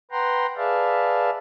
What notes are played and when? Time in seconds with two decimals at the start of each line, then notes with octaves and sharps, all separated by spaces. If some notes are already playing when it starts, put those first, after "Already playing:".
0.11 B4 F#5 G5 A#5 C6
0.57 G#4 B4 D5 E5 F5 A5